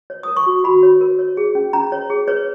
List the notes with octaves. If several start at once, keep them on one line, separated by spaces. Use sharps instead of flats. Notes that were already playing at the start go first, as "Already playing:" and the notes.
C#5
A#4 D#6
C#6
F#4
F#4 B5
C#5
A#4
C#5
G#4
C#4
C#4 A#5
C#5
G#4
B4 C#5